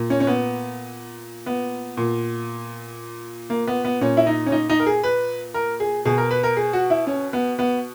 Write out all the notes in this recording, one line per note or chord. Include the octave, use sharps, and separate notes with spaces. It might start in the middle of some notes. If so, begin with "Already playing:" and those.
Already playing: A#2
C#4
C#4
B3
B3
A#2
A#3
B3
B3
A#2 C#4
E4
D#4
C#4
D#4
D#4
A#4
G#4
B4
A#4
G#4
B2 G#4
A#4
B4
A#4
G#4
F#4
E4
C#4
B3
B3